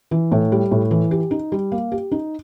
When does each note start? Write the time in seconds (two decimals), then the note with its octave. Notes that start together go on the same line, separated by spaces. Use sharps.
0.11 E3
0.32 A2
0.52 G3
0.71 A2
0.91 E3
1.11 G4
1.31 D#4
1.52 G3
1.72 A#3
1.92 G4
2.12 D#4